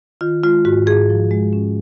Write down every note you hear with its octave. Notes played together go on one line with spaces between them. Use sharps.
D#3 F4
G#3 F4
G#2 F#4
G#2 G#4
F3
G#3
C#4